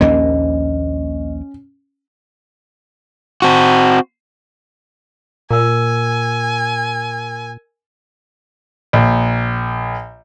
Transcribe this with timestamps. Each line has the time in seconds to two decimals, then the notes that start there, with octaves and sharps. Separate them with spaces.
0.01 A#1 D#2 A#3 C#4 D#5
3.42 C4 F#4
5.51 A#2 A#4 G#5 E6
8.93 A#1